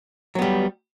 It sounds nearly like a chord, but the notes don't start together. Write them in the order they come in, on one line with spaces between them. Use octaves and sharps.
F#3 B3 G3